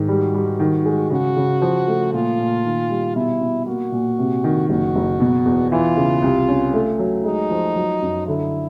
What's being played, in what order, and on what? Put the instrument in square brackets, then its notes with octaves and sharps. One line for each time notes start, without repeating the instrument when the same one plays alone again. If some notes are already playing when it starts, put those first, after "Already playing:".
Already playing: [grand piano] G#2 D#3
[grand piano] G3 [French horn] F#4
[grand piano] G3
D#3
G#3
[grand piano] C#3 [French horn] F#4
[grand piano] C#3
F3
A3
[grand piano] A#2 [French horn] F4
[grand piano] A#2
D#3
G3
[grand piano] B2 [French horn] E4
[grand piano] B2
[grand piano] A#3 [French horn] F#4
[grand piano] A#2
C3
D#3
[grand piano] F#1 [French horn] F#4
[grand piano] F#1
B2
E2
[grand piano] E3 [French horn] F4
[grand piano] C#3
C2
C#4
A3
F#3
[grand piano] G#3 [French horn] D#4
[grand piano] F3
F#3
F#2
[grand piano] D3 [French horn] E4